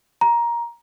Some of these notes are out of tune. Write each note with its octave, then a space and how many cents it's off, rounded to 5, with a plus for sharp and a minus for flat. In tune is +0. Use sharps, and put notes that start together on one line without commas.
A#5 +15